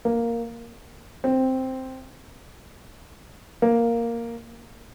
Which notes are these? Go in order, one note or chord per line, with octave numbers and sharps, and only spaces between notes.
A#3
C4
A#3